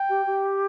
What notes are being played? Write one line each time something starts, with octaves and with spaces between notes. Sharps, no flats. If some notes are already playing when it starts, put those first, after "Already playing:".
Already playing: G5
G4
G4